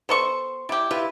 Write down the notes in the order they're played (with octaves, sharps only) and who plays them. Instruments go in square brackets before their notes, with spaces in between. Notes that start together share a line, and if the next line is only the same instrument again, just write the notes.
[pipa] B3 A4 C#6 [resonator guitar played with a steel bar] C5
[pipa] G3 G4 [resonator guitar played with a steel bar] E4
[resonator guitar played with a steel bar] E4 G4 B4 [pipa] F4